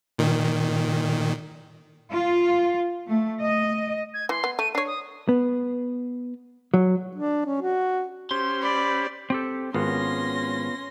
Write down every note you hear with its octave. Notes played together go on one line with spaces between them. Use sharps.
A#2 D#3
F4
A3
D#5
G#6
E3 C6
B3
A3 D#7
D4 C#5 C7
D#6
B3
F#3
D4
C#4
F#4
C#4 G4 C5 C6
D5 B5
C4 G4 A4
G#1 B3 C#4 F4 C6 A#6